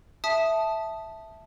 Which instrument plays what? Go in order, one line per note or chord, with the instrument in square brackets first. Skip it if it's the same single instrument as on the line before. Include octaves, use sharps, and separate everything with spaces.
[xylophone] E5 A5 D#6 B6